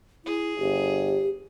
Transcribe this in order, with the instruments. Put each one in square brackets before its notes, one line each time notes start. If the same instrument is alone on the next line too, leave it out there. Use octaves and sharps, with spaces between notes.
[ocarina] E4 [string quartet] G#4
[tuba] G1 [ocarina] G4